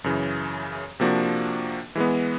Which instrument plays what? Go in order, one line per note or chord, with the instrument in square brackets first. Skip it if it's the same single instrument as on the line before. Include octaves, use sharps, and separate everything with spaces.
[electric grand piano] F#2 C#3 E3
C3 F3 A#3 D4 F#4
E3 G#3 B3